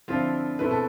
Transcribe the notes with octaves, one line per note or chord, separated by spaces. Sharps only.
D3 F3 C4 E4 F4 F5
B2 A3 C4 E4 B4
A4